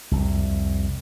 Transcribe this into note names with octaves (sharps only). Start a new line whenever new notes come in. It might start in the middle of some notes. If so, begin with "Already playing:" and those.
C2 F2